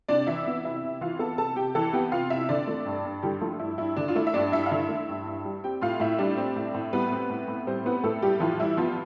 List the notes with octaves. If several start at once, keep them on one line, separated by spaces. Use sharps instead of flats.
C3 D4 D5
E3 E4 E5
B3
C3 E4 E5
C3
E3 F4 F5
B3 A4 A5
C3 A4 A5
C3 G4 G5
E3 A4 A5
B3 G4 G5
C3 F4 F5
C3 E4 E5
D3 D4 D5
A3
G2
G2
D3 G3 G4
F3 A3 F4
G2 E4
G2 E4
D3 D4
F4
A3 E4
E5
G2 D4 D5
G2 E4 E5
F5
D3 E4 E5
A3
G2
G2
G3
C4 G4 G5
A2 F4 F5
A2 E4 E5
G3 D4 D5
C4
A2
A2
G3 B3 B4
C4
A2
A2
G3 C4 C5
B3 C4 B4
A2 A3 A4
A2 G3 G4
E3 F3 F4
G3 E4
F3 B3 F4